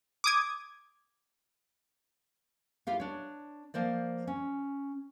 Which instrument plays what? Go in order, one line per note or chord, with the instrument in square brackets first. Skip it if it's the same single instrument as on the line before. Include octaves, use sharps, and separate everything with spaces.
[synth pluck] D6 D#6 G#6
[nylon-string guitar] E4 F4 G4 F5
D4 C#5
F3 A#3 C5 D5
C#4